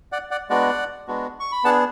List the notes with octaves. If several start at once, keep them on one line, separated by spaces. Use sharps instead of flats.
D5 F#5
D5 F#5
G#3 B3 D4 F#4 D5 F#5
G#3 B3 D4 F#4
C#6
B5
B3 D4 G#4 F#5 A5